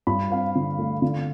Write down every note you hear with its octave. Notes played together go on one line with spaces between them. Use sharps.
G2 B5
C4 F5
D3
A3
D3